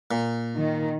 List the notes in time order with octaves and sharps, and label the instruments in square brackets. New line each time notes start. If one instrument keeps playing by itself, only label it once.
[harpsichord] A#2
[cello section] D#3